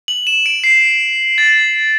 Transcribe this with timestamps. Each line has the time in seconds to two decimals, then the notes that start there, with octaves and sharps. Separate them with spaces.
0.08 F#7
0.27 E7
0.46 D7
0.64 C7
1.38 A6